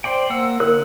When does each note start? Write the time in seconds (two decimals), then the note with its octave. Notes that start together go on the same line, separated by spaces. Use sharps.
0.04 C5 D5 G5
0.30 A#3 F#5 E6
0.60 D3 A#4 F#6